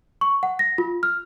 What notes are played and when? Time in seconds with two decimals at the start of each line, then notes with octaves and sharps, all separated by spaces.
0.21 C#6
0.43 F#5
0.59 A#6
0.78 F4
1.03 F6